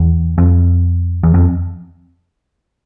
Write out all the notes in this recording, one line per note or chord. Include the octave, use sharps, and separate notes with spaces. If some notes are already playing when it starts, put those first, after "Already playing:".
Already playing: E2
F2
E2
F2